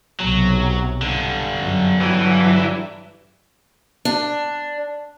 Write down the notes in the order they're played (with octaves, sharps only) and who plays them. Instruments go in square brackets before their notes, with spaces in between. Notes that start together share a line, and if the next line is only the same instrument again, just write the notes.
[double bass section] B1 C3 [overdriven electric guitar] F#3
[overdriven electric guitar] G2 D3
[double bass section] F#2
[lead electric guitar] E3 [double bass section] F#3
[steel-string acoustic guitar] D4